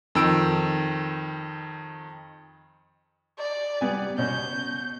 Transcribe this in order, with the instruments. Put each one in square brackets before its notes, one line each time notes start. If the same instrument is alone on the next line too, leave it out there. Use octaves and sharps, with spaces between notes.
[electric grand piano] F2 D#3 E6 D7
[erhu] D5
[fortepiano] G3 B3 G#5
[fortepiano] B2 C#4 [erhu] G6